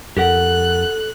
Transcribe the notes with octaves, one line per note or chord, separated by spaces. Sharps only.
F2 G4 A4 A#4 F#5 F#6